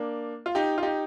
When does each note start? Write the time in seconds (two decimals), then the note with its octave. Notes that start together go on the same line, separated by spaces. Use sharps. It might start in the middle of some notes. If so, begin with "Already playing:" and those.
Already playing: A#3 D4
0.46 F4
0.55 D#4 G4
0.78 F4
0.83 D#4 G4